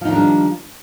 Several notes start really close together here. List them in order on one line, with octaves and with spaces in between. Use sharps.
F3 D#4 D#3 D4 G3